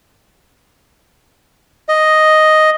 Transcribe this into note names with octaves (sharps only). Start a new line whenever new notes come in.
D#5